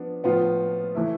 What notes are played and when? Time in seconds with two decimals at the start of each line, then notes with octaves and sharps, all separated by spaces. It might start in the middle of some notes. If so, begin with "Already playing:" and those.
Already playing: F3 B3 D4
0.24 A2 F3 B3 F4
0.95 E3 A3 E4